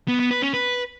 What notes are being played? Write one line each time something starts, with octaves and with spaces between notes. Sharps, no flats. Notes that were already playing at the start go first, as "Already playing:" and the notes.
B3
B3
B4
C#4
B4